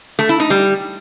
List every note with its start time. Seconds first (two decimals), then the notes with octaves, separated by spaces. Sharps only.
0.19 A3
0.29 E4
0.40 D#4
0.50 G3